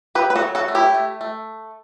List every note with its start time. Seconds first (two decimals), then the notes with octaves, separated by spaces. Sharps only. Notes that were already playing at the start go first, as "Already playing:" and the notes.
0.15 F#3 G4 B4
0.30 B4
0.36 F#4 A4
0.42 F#3
0.55 F#4 A4
0.68 A3
0.75 E4 G4
0.94 A3
1.21 A3